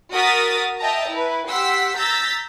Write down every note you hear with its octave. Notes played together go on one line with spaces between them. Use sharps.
F#4 A#4 D#6 A6 B6
D#5 E5 G5 A5 A#5
E4 B4
G4 F#5 C6 E6 B6
A#5 E6 G6 A6 B6